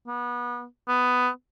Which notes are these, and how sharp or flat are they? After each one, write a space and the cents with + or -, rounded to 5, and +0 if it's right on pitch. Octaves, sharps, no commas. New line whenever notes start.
B3 -30
B3 +10